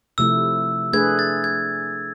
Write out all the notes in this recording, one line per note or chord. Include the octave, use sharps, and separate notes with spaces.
C3 F3 A3 E4 E6
A3 D4 G#4 B4 G#6
A6
G#6